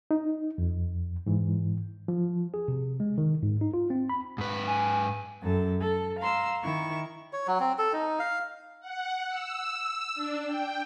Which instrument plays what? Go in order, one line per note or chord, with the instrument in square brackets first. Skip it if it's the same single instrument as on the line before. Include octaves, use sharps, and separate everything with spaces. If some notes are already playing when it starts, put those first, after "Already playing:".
[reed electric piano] D#4
F2
G#2 E3
F3
[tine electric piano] G#4
C3
G#3
D#3
G#2
D#4
F4
C4
B5
[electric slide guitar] G#2 B4
[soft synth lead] G#5
[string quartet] F#2 A4
A4
F5 A#5 C6 E6
D#3 E4 C#6
[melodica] C#5
F#3
C4
A4
D#4
F5
[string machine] F#5
E6
D4
G5